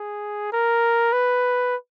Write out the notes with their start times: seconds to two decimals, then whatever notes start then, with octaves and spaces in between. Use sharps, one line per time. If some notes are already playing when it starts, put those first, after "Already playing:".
Already playing: G#4
0.52 A#4
1.13 B4